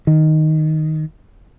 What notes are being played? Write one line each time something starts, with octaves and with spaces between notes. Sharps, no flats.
D#3